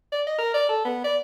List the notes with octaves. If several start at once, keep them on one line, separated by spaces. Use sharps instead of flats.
D5
D#5
A#4
D5
A4
B3
D5